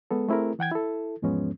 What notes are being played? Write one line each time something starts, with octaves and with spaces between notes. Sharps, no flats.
G#3 B3 A4
A3 C4 E4 G#4 A#4
E3 F#5 G5 G#6
E4 A4
E2 G#2 F3 G#3 B3 C#4